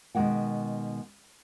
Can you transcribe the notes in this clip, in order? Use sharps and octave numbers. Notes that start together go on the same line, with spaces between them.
B2 D#3 G#3 A#3 F#5 G5